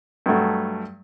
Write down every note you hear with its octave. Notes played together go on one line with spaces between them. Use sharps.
G2 F#3 A3